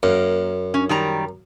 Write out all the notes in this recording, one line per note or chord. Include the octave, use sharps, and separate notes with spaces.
F#2 A#3
C#4
D#3 G3 A#5